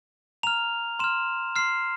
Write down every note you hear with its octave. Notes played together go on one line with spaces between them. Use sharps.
A#5 F6 F7
C6 F6 E7
C6 F6 C7